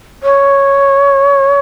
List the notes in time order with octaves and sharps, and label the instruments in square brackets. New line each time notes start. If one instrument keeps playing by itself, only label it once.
[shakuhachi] C#5